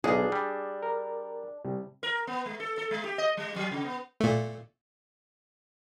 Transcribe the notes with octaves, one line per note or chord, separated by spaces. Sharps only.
B1 D4 G#4
G3
A#4
C3 G3
A#4
B3
G#3
A4
A4
G#3
G4
D#5
G3
F#3
C#3
B3
A#2 A3